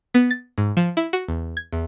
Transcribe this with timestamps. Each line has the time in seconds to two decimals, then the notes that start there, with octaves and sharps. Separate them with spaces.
0.14 B3
0.31 A6
0.58 G#2
0.77 F3
0.97 E4
1.13 F#4
1.28 E2
1.57 G#6
1.73 E2